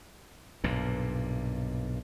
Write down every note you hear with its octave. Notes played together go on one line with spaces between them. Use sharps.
B1 G2 A#2